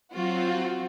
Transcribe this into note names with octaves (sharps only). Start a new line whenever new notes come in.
F#3 C4 F4 F#4